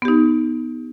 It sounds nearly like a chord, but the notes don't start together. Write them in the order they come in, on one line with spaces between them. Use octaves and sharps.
B3 G4 D#4